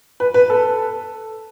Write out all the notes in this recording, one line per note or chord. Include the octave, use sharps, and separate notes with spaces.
B4
B4
A4